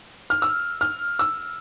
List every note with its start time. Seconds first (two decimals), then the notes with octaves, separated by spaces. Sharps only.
0.30 F6
0.42 E6
0.81 F6
1.19 E6